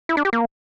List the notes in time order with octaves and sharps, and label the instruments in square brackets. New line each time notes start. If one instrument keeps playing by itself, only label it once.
[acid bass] E4
D4
G4
A#3